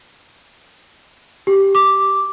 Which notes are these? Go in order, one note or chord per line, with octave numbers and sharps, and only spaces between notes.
G4
D6